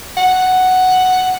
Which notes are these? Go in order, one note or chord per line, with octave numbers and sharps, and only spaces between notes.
F#5